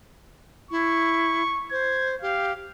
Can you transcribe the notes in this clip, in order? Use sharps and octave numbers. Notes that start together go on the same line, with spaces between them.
E4 C#6
C5 G#6
G4 F5